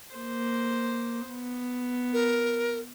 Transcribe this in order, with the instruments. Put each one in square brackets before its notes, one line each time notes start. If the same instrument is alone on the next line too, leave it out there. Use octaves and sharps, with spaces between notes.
[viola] A#3 C5
B3
[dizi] A#4